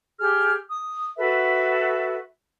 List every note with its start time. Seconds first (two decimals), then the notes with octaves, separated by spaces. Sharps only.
0.19 G4 G#4 F6
0.69 D#6
1.17 F#4 A4 B4 E5